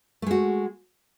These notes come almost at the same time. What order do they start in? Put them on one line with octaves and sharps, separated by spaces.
A3 G#3 F#4